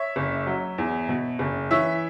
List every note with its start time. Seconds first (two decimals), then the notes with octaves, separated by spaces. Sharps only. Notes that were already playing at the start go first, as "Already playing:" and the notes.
Already playing: C#5 E5
0.16 F#1
0.47 F#3
0.78 E2
1.09 B2
1.39 F#1
1.71 E3 C#5 E5